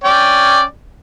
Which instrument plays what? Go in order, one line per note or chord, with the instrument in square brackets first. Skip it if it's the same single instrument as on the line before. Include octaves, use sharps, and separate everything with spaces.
[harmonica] C#4 D5 G5